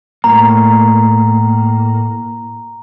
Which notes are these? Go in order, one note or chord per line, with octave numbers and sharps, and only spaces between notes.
A2 A#3 A#5